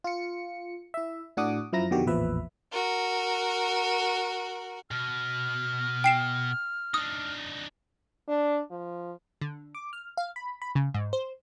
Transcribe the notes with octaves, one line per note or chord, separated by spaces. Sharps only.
F4 C#7
E4 E5
A2 D4 F#4 F#5 D6 D#6
F#2 F3 E4 A#5 A#6
F2 B2 D3 D#3 F#4 G4
A1 E2 A#2 F3 B4 E5
F#4 A#4
B2 F6
G5 C7 E7
D4 D#4 D#6
D4
F3
D3
D6
F6
F5
B5
B5
C#3
G#2
C5